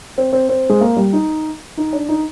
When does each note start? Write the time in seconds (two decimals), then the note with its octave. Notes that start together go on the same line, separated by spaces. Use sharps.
0.18 C4
0.33 C4
0.49 C4
0.70 G#3
0.81 A#3
0.97 G3
1.13 D#4
1.77 D#4
1.93 D4
2.09 D#4